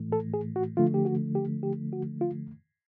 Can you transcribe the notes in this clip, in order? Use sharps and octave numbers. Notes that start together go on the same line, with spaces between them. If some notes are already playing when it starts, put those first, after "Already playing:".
Already playing: A2 E3 A3
A4
G#4
F#4
D3 F3 A3 F4
G4
F#4
G4
G4
F#4
F4